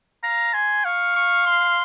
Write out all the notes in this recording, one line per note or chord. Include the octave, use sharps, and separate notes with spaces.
F5 A#5
G#5 C6
F5 C#6
C#6
C6